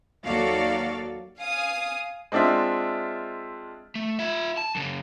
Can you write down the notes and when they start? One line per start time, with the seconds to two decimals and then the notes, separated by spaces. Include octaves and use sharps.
0.24 D#2 F#3 F#4 A4 D5 F5
1.39 F5 G#5 D#6
2.32 G#3 C4 D4 F4 E5
3.95 A3
4.19 F4 E5
4.57 A5
4.75 F#2 C#3